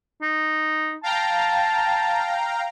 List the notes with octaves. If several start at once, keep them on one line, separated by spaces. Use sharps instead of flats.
D#4
F5 G5 A5 A#5